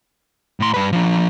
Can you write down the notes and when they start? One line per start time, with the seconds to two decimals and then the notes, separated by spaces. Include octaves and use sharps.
0.60 A2 C6
0.74 G2 B4
0.92 F3 D4